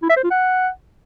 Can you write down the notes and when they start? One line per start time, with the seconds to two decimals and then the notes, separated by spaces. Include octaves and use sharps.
0.02 E4
0.09 E5
0.16 C5
0.23 F4
0.31 F#5